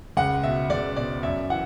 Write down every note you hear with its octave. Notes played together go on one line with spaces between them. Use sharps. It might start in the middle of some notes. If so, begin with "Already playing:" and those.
C#2 F#5
B2 E5
C#2 D5
B2 D5
F#2 E5
E3 F#5